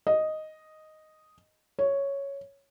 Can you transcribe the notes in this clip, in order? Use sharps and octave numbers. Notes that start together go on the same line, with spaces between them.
D#5
C#5